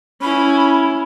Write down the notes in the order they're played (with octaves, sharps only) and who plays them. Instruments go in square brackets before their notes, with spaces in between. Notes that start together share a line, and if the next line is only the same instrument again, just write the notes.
[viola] C#4 E4 [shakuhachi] B5